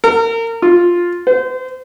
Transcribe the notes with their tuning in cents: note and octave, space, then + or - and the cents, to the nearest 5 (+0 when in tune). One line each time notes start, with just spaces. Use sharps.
A#4 -30
F4 +5
C5 -30